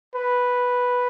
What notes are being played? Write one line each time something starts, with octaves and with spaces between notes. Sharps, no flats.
B4